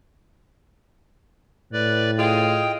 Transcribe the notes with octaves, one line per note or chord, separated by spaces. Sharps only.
A2 B4 D5
F4 G#4 D#5 G5